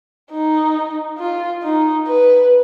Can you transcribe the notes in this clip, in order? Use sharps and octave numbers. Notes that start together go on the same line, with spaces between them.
D#4
F4
D#4
B4